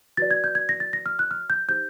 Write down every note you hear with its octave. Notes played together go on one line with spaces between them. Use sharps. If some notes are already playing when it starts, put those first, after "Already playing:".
F#4 B4 D5 A6
G#6
G6
G#6
A#6
A6
A#6
F6
F#6
F6
G6
D#4 G4 C5 G6